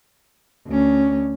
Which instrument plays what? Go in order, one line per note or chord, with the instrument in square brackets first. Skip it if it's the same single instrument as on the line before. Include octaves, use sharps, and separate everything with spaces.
[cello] D2 C#4